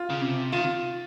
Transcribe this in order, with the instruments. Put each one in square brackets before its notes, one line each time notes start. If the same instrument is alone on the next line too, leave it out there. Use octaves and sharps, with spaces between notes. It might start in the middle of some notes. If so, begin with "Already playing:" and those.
Already playing: [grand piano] F4
[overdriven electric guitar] C#3
C3
[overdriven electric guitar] D#3 [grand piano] F4